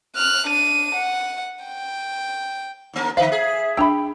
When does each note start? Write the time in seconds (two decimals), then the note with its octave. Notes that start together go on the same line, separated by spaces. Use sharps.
0.16 F6 F#6
0.48 D4 D#7
0.95 F#5
1.65 G5
2.93 D#2 A#3 A#4
3.17 D3 B4 C5 E5 F5
3.32 G#4
3.77 D4 G5 B5 E6